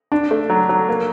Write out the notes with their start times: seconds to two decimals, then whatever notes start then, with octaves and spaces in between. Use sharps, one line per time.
0.12 D4
0.31 A3
0.50 F#3
0.69 F#3
0.89 A#3